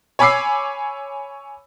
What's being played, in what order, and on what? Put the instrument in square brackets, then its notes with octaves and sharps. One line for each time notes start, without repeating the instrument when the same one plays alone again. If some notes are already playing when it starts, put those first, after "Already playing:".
[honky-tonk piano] C#5 G#5 B5 D6 E6 C7